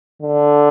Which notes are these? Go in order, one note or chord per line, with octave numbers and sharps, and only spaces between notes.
D3